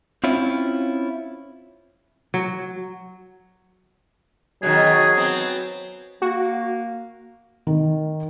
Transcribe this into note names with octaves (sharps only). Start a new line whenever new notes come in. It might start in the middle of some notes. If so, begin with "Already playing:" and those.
C4 C#4 E4 F4
F#3
B2 D#3 F#3 G#4
B3 C4
A#3 F#4
D#3